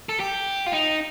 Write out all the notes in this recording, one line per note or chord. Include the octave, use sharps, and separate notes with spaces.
A4
G4
F4
D#4